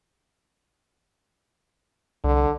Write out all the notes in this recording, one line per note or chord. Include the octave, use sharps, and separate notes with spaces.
C2 D3